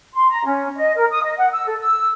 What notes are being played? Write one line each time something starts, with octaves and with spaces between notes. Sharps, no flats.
C6
A#5
C#4
D#5
A#4
D#6
D#5
F#5
E6
A4
E6